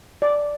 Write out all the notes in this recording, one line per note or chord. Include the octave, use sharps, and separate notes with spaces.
D5